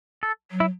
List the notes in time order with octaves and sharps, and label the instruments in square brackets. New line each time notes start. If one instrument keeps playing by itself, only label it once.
[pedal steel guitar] A4
[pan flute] F#3
[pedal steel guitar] E4